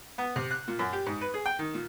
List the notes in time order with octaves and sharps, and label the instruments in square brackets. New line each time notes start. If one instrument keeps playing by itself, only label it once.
[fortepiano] B3
C3
F#6
A#2
F#2
G4
G#2
B4
G#4
G5
D#3
A#2